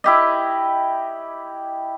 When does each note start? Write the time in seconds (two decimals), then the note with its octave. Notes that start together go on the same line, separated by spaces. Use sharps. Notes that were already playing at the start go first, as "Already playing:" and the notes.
0.04 E4 G4 D#5